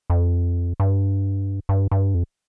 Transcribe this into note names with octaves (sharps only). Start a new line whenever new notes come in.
F2
G2
G2
G2
F2